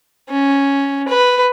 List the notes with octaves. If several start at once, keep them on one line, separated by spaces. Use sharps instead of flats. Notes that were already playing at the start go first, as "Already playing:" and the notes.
C#4
B4